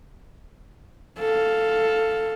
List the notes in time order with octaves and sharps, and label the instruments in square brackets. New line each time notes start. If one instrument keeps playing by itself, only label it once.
[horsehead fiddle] A4 F5